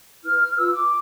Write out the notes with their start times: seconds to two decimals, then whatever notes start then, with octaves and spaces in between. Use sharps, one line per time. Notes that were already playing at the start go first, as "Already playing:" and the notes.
0.24 E4 B4 F6
0.40 F6
0.52 F6
0.56 F4 B4 E6
0.73 D6